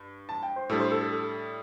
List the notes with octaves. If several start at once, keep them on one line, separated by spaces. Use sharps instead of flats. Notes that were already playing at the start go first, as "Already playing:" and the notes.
Already playing: G2
A5
G5
C5
A2 G3 D4 A4
C5
A4
A4
A4